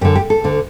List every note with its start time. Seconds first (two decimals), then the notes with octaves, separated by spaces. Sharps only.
0.01 F#2 G4
0.05 D3
0.15 G4
0.30 A4
0.44 D2 D3